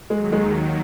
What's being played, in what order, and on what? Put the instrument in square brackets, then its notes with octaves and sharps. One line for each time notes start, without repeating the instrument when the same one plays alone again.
[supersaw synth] D#2 D#3 F#3 [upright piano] G#3
[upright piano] G#3